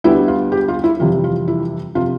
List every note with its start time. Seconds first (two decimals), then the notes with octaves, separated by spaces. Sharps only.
0.04 D2 D3 G3 B3 E4
0.28 F4
0.52 G4
0.68 F4
0.84 E4
1.00 F2 C3 E3 G3 F4
1.24 F4
1.48 E4
1.95 C3 F3 F4